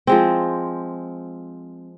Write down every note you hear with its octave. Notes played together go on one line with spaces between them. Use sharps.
F3 G#3 C4